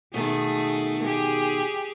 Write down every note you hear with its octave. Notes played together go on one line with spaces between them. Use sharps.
B2 D#3 A3 G#4
G4 G#4